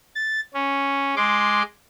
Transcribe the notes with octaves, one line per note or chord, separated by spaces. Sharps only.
A6
C#4
G#3 C6 D6